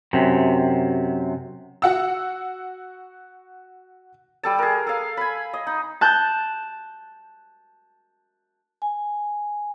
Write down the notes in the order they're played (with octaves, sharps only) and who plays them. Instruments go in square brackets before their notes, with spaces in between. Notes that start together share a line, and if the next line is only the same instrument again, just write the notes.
[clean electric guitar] F#2 C3
[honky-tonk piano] F#4 F#5 E6
[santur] G3 A4 A5
G#4 A#4
A4 F5
G#5 B5
D#5
D#4
[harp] A5 F#6 G6
[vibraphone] G#5